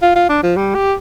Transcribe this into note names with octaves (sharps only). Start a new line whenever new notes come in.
F4
F4
D4
F3
G3
G4